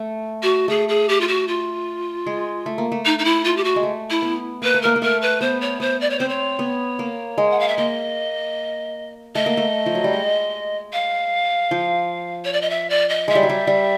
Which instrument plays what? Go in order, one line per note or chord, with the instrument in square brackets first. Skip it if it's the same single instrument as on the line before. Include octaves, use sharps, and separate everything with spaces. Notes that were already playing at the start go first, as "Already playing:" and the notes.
Already playing: [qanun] A3
[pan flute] F#4
[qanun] A3 [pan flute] G#4
[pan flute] G#4
G4
F4
F#4
F4
[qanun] G#3
A3
A#3
A3
[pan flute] D#4
D#4
E4
F4
G4
F#4
[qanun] G#3
A3
[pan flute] E4
[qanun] B3
[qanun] A#3 [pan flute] B4
[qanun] A3
[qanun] A#3 [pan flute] A#4
[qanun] A#3
[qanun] A3 [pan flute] A#4
[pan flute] B4
[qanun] B3 [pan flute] C5
[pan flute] C#5
[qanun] B3 [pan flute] C5
[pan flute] D5
C#5
[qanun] C4 [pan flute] C5
[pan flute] C#5
[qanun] B3
A#3
G#3
[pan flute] F#5
F5
E5
[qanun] A#3 [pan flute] D#5
[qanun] A3 [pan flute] D#5
[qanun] A#3
A3
F3
F#3
G3
G#3
[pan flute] F5
[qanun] F3
[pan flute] C#5
D5
D#5
E5
D5
D#5
[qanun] G#3 [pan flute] E5
[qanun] G3
F#3
G3
G3